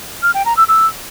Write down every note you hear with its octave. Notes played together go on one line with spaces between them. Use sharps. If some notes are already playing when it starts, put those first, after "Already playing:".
F6
G5
A#5
E6
E6